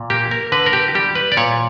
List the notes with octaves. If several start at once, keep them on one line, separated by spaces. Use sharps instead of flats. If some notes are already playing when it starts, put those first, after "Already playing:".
Already playing: A#2
A#3 G4
A#4
D3 B4
A#4
G4
G3 G4
B4
D5
A#2 C#5